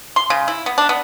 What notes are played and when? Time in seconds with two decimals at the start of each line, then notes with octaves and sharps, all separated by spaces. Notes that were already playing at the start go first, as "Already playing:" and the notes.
0.16 C6
0.30 C#3
0.48 E4
0.66 B3
0.78 D4
0.89 B3